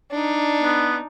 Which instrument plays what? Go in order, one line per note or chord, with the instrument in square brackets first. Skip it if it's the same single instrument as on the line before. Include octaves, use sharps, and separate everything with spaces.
[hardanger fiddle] D4 D#4
[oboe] B3